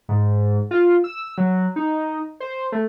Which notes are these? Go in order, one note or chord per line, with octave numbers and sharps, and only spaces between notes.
G#2
F4
E6
F#3
D#4
C5
A3